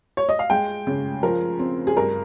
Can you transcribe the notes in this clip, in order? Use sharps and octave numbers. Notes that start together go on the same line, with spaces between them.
C#5
D#5
F5
G#3 G5
C#3
F3 A#4
C4
G#4
G2 A#4